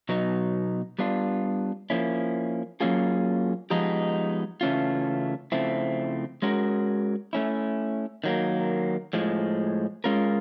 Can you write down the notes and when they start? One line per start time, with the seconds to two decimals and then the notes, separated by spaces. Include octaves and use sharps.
0.09 B2 F#3 B3 D#4
0.99 G3 B3 D4 F4
1.90 F3 A#3 C#4 E4
2.80 F#3 A#3 C#4 F4 G#4
3.71 F3 G#3 B3 D#4 G4
4.61 C#3 E3 A3 C#4 F4
5.52 C#3 F3 A3 C4 E4
6.42 G#3 C#4 F#4 A#4
7.33 A3 C#4 E4
8.24 D#3 F#3 A#3
9.13 A2 F3 G#3
10.04 G#3 C#4 F4 A#4